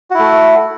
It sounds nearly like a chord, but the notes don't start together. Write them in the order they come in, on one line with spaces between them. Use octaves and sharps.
F#4 E4 A3